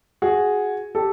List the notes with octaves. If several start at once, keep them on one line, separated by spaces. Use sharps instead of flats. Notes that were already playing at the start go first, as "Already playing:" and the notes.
F#4 G#4
G4 A4